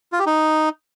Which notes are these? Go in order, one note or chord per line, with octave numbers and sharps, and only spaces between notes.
F4
G4
D#4